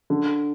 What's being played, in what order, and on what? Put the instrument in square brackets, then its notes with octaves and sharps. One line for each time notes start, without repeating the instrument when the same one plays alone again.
[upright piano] D3